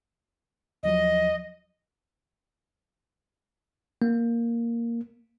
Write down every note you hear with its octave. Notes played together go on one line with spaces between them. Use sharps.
D#2 F3 F#3 D#5
A#3